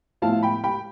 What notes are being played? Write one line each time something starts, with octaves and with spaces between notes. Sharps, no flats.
A2 F3 B3 E4 F5 A5
G5 B5
G5 B5